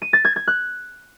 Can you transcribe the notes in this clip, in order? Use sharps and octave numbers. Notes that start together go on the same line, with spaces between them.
D#7
A6
G#6
G#6
F#6